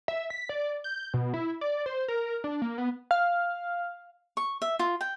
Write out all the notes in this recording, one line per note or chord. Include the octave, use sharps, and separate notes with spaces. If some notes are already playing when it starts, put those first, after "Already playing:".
E5
B6
D5
G6
B2
E4
D5
C5
A#4
D4
A#3
B3
F5
C#6
E5
F4
G5